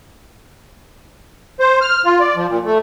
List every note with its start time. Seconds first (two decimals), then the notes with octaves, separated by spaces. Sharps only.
1.60 C5
1.81 F6
2.05 F4
2.20 D5
2.36 F3
2.49 A#2
2.65 A3